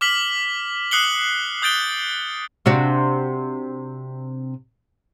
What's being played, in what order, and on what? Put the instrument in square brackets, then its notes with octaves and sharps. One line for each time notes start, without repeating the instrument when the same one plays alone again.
[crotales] D6 F6 B6 F#7
D#6 F#6 C7 C#7 F#7 G7
D#6 G6 A6 D7 G7
[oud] C3 D4 F#4